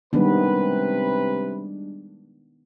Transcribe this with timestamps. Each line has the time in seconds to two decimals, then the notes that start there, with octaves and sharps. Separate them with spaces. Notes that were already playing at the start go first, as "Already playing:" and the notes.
0.13 C3 D#3 G3 G#3 B3 D4 B4